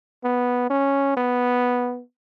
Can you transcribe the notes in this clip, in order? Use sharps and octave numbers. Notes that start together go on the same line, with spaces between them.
B3
C#4
B3